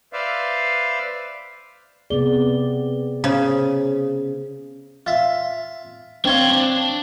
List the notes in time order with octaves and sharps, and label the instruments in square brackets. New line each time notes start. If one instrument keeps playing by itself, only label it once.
[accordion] B4 C5 D5 E5 F5
[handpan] C3 B3 D5 [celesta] G#4 G7
[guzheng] C#3 [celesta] C5
[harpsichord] F4 E5
[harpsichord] C4 C#5 F5 [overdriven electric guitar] D4 C6
[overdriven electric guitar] D4